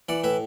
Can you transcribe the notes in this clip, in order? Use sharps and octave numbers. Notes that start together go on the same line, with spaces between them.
E3 D5 F#5
A2 B4 E5